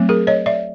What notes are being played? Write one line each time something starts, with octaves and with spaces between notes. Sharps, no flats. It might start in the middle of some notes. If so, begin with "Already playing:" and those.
Already playing: F#3 A3 C4
G#4 A#4
C#5 D#5
D5 E5